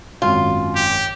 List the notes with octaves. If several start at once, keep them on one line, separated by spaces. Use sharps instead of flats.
G#1 F#2 F4
G4